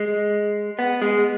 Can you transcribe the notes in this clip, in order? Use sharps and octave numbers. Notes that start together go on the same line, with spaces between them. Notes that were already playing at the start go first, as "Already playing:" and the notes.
Already playing: G#3
B3
G#3